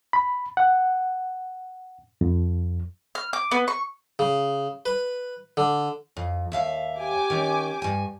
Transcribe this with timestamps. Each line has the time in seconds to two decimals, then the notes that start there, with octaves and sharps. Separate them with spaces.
0.13 B5
0.57 F#5
2.21 F2
3.15 F6
3.33 D6
3.51 B3
3.68 C#6
4.19 C#3
4.86 B4
5.57 D3
6.17 F2
6.52 D#2 E5 F5
6.97 G4 G#5 D6
7.30 D#3 C#4
7.82 G2 G#5